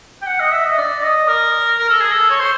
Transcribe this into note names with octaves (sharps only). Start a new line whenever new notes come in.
G5
F#5
D#5
E5
D#5
D5
D#5
A#4
A#4
A4
G#4
A4
C#5
C5